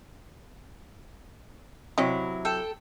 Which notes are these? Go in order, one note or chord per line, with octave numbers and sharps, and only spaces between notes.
C3 F#3 C4 E4 D#5
A4 G5